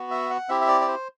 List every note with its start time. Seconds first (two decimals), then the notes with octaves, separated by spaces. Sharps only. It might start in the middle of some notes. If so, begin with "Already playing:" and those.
Already playing: B3 F#4
0.11 E5
0.30 F#5
0.49 C4 E4 G4 E5
0.61 E5
0.68 D5
0.81 D5
0.88 C5